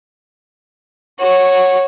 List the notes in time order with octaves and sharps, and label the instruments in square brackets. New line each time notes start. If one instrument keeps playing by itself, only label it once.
[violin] F#4 C#5